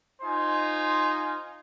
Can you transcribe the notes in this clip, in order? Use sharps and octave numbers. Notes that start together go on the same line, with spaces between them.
D#4 F4 C5 G#5